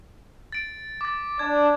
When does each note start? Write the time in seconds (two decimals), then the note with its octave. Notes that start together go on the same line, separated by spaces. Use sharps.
0.52 A6 D7
1.01 D6 A6
1.39 D4 G#6